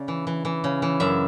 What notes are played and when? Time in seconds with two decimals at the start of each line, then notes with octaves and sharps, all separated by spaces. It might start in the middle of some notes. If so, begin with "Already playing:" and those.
Already playing: C#3 D5
0.08 E3
0.27 E3
0.45 E3
0.64 C#3
0.82 E3
1.00 F#2 E5